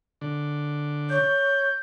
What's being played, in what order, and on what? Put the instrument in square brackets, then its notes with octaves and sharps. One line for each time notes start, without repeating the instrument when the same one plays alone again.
[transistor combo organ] D3
[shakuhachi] C#5 [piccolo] G6